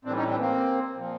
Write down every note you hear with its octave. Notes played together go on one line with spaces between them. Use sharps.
A2 E3 G3 C4 D4
C#4 D#4
C4 D4
A#3 C4
A#2 F3